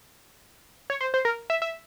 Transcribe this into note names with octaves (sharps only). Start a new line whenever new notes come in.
C#5
C5
C5
A#4
E5
E5